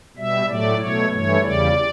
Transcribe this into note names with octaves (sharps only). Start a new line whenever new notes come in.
B2 G3 E5
A2 F#3 A3 D5
B2 F#3 A3 C#5
G2 E3 A3 C#5
E2 C#3 G3 D5